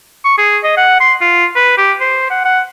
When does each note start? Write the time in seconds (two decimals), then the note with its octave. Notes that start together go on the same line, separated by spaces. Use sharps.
0.24 C#6
0.38 G#4
0.64 D#5
0.77 F#5
1.00 C6
1.21 F4
1.55 B4
1.77 G4
2.01 C5
2.30 F#5
2.44 F#5